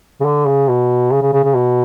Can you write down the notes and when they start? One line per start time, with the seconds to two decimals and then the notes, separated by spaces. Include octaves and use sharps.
0.20 C#3
0.25 D3
0.47 C#3
0.68 B2
1.11 C#3
1.22 C#3
1.33 C#3
1.44 C#3
1.54 B2